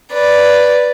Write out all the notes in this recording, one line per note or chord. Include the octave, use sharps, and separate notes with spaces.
B4 D5